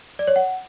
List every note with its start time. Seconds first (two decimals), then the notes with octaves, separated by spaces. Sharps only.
0.19 D5
0.27 C#5
0.36 F#5